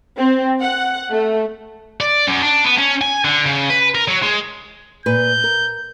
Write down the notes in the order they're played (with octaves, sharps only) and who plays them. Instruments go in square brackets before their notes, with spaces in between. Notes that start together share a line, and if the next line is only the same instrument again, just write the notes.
[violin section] C4
F#5
A3
[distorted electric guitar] D5
F#2
D4
B3
C#4
G#5
D3
C#3
B4
A#4
F#3
G#3
[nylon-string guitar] A#2 B4 [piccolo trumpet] G6
[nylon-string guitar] A#4